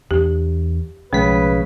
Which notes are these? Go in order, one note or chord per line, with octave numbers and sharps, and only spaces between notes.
E2 D4 G4
B1 C#3 F3 G#3 A3 B4 B6